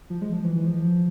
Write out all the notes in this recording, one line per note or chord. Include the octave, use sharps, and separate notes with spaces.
F3
G#3
F3
E3
E3
F3